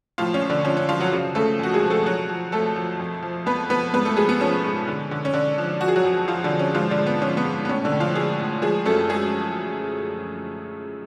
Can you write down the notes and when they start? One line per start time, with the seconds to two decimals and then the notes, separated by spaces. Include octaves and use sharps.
0.18 A2 F3 F4
0.34 C#4
0.42 F3
0.50 D3 D4
0.65 F3 C#4
0.77 C#4
0.88 F3 F4
1.00 F#3 F#4
1.13 C#3
1.35 C#3 A3 A4
1.59 F2 F#4
1.74 G#3 G#4
1.83 F3
1.90 A3 A4
2.06 F3 F#3 F#4
2.29 F3
2.52 F2 A3 A4
2.76 F3
3.00 F2
3.23 F3
3.46 F2 B3 B4
3.70 F3 B3 B4
3.94 G#2 B3 B4
4.05 A3 A4
4.16 F3 G#3 G#4
4.29 B3
4.41 F3 C#4
4.64 G#2
4.88 D3
5.11 D3
5.25 C#4
5.34 D3 D4
5.58 F3
5.81 F3 F#4
5.88 G#4
5.96 F#3 F#4
6.04 F2
6.28 F3 F4
6.44 D3 D4
6.51 F3
6.59 C#4
6.74 G#2 F3 F4
6.90 D3 D4
6.99 G#2
7.06 B3
7.22 F3 C#4
7.37 B3
7.45 G#2
7.65 B3
7.69 A2 C#4
7.84 D3 D4
7.92 A2
8.00 F3 F4
8.15 F3 G#3 G#4
8.39 A2
8.62 F3 G#3 G#4
8.85 F#2 A3 A4
9.09 G#3 G#4